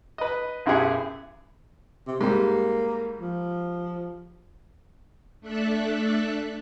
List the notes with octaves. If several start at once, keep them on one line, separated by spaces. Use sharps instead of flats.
B4 D#5
B1 F#2 E4 G4 G#4 F#5
C3
G#2 G3 A#3
F3
A3 D4 A4 E5 F#6